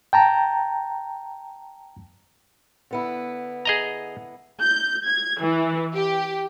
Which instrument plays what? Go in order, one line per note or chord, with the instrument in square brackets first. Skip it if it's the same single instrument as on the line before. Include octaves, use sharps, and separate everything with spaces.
[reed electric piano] G5 A5 A#5
[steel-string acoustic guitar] D3 B3 E4
[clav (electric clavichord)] G#4 D#5 A#5
[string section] G6
G#6
E3
G4